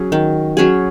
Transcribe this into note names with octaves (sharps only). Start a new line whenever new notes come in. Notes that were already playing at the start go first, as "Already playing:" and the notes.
Already playing: F#3 C#4 G#4
D#3
F#3 C#4 G#4